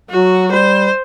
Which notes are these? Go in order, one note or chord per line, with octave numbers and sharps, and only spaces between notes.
F#3 F#4
G3 C5